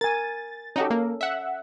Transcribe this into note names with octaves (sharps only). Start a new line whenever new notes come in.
A#4 G#5 A6
C#4 D#4 F#4 G4 A4
A#3
E5 F#5